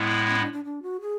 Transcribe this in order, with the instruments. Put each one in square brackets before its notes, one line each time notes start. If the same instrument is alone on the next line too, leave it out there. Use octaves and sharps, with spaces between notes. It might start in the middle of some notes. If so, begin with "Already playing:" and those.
Already playing: [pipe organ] A2 G#3 B3 E4
[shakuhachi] C#4
D4
D4
D4
F#4
G#4